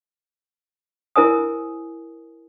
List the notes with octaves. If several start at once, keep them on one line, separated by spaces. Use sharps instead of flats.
E4 A#4 C5 G#5 D#6